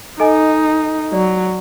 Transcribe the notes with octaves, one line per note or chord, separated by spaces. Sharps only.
D#4 A4 D#5 G#5
F#3 D5